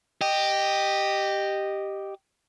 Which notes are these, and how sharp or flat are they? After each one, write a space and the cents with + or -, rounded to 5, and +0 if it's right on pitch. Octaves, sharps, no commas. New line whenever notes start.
G4 +0 D#5 -10